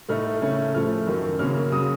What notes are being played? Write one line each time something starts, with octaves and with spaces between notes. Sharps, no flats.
A2 A3 D#4 F6
C#3 A3 C#4
A2 F3 A3 F6
F#2 D#3 F#3
F#2 C#3 F#3 A#3 C#4 F6
C#3 F#3 D#6